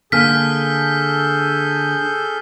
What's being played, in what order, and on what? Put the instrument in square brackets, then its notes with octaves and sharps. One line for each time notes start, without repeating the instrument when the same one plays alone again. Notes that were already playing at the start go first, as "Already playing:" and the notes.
[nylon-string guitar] D3 A#3 G#5 [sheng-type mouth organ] G#4 A4 G6 [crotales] F6 B6